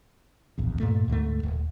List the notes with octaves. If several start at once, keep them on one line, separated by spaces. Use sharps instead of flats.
D1 A#1 E2
G2 A#2 A3
D2 G#2 G#3 A3
D#1